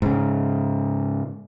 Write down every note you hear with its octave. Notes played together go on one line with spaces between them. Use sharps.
G#2 C#3